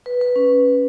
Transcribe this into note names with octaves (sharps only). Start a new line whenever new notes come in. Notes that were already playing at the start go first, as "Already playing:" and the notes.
B4
B4
C#4